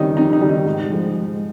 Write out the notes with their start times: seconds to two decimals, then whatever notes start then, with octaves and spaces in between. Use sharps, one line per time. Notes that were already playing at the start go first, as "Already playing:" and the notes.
Already playing: F2 D#3 G3 C#4 D#4
0.17 F2 D#4
0.33 D#4
0.41 D#3 G3
0.49 D#4
0.66 G#2
0.90 F3 G#3
1.14 G#2